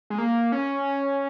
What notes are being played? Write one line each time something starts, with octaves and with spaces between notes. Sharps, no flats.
G#3
A#3
C#4